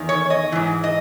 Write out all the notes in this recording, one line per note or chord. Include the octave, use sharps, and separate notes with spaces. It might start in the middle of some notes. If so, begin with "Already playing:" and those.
Already playing: E2 D#3
C#5
D#5
G#2 E3
D#5